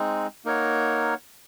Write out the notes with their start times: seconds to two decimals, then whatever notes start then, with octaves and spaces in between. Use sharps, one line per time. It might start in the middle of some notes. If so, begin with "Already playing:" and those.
Already playing: G#3 C4 D#4
0.45 A#3 D#4 A#4 C#5 F#5